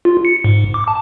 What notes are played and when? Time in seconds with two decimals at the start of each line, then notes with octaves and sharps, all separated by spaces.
0.05 F4
0.25 C#7
0.45 G#2
0.74 D6
0.88 A5